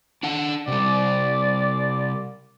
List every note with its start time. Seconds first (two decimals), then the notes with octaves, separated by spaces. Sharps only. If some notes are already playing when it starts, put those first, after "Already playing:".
0.23 D4 F#5 A5
0.68 C3 G3 D5